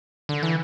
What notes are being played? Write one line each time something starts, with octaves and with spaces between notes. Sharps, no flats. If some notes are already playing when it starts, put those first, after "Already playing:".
D3
E3